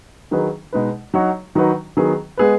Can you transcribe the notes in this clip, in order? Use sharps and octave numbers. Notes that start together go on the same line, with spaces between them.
D#3 F#3 D#4 G#4 B4
B2 G#3 D#4 B4
F#3 D#4 F#4 C#5
D#3 F#3 D#4 F#4 B4
D#3 F#3 B3 G#4
G#3 B3 G#4 B4